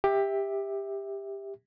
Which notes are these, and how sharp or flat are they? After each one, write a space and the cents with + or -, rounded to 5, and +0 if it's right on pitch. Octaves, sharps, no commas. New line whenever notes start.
G4 +15 E5 -10